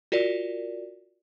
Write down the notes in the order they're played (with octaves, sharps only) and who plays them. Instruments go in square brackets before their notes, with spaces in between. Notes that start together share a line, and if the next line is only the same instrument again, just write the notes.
[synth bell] F4 F#4 A#4 D5